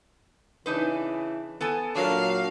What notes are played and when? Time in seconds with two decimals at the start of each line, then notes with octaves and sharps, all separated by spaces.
0.66 C#3 E3 D4 D#4 B4
1.61 B3 A4 G#5
1.95 A#2 F#3 D4 A#4 F5